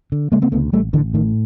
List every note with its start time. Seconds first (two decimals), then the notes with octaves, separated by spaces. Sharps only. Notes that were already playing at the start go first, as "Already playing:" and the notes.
0.12 D3
0.32 C#3 G#3 A#3
0.42 A#3 C4
0.52 D2 A3 B3
0.73 A1 G3 A3
0.93 A1 D3 E3
1.14 A2 D#3